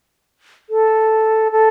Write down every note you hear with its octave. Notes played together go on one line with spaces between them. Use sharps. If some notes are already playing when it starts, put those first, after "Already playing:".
A4
A4